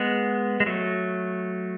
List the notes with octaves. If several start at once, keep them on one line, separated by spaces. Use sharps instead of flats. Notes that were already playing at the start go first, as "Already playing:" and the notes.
Already playing: G#3 B3
G#3
F#3 A3